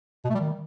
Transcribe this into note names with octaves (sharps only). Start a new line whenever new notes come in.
B2
A3
G3
D#3